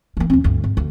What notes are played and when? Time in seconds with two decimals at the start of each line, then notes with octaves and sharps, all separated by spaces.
0.17 E3 A#3
0.30 D#2 C4
0.44 D2 G2
0.64 G#1
0.77 D2